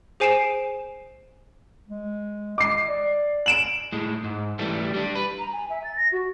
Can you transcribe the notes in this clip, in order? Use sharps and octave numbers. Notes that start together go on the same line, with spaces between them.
G#4 C5 G#5 C7 D7 E7
G#3
D#5 D6 C7
D5
D7 E7 F#7
A2 G#3
G#2
E3 G3 A3
G3 D4
B4
A#5
G#5
E5
A6
A#6
F#4